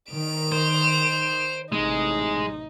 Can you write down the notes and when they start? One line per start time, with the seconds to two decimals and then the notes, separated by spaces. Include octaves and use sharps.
0.11 D#3 D7 F7
0.52 C5
1.72 A1 C3 G#3 D#4